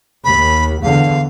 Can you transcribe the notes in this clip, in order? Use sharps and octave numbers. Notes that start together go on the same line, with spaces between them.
D#2 B5
E2 D3 F5